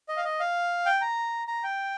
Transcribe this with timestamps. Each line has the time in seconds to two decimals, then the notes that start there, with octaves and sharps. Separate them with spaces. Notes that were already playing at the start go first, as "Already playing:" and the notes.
0.09 D#5
0.17 F5
0.25 D#5
0.40 F5
0.86 G5
1.01 A#5
1.48 A#5
1.64 G5